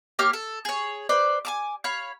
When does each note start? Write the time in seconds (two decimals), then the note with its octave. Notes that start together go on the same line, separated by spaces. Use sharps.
0.19 A#3 G4 C#5 F6
0.33 A4
0.65 G#4 C#5
1.09 B4 C5 D5
1.45 G#5 A5 D6
1.84 C#5 F5 B5